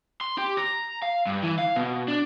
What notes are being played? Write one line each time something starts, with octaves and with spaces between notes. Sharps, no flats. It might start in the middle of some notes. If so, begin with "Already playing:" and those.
C6
G4
A#5
F5
G2
E3
F5
B2
D4